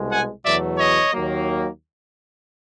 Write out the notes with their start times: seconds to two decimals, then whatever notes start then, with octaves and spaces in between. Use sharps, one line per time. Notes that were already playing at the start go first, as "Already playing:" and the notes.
Already playing: C2 B2 G#3
0.10 F#5 G#5
0.44 E2 B2 F#3 A3 D5 E5
0.78 C#5 D#5
1.13 D#2 D#3 F#3 A#3